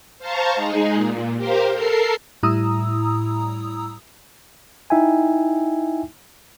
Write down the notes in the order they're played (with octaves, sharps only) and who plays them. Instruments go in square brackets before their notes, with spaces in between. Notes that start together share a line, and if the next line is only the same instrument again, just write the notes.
[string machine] C5 F5 A5 A#5 C#6
G#3 D#4 G#4
A#2
G4 A#4 C5 F5
A4 A#4 C7
[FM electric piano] A2 G3 E4 A#5 D#6 E6
[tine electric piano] D#4 E4 E5 G5 G#5